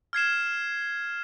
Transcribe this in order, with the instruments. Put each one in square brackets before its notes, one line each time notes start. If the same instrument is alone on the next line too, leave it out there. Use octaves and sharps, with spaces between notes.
[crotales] F6 G#6 C7 E7